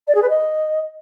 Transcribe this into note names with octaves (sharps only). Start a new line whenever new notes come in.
D5
G#4
B4
D#5